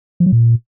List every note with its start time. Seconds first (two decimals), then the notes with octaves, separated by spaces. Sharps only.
0.20 F3
0.26 F#3
0.32 A#2